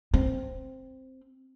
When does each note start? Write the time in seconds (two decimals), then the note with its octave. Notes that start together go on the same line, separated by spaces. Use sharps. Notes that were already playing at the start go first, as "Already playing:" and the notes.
0.14 C4